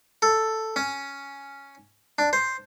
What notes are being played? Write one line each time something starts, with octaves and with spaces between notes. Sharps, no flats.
A4
C#4
D4
C5